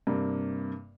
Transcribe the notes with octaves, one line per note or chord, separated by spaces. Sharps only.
G2 C3 A#3